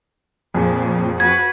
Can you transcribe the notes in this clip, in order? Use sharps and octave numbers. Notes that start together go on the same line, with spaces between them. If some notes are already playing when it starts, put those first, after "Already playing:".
F2 A#2 F3 G#4
F#4 B4 G#6